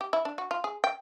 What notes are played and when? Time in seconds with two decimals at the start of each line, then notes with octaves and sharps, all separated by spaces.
0.01 G4
0.13 E4
0.25 D4
0.38 F#4
0.51 F4
0.64 G#4
0.84 G5